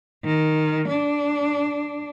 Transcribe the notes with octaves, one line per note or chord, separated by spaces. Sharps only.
D#3
D4